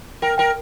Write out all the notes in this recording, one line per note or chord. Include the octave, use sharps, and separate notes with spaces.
A#4 G5
A#4 G5